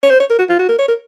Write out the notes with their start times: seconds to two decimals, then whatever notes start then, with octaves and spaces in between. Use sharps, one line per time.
0.03 C#5
0.10 C5
0.20 C#5
0.30 A#4
0.39 F#4
0.49 F4
0.59 F#4
0.69 A#4
0.79 C#5
0.88 A#4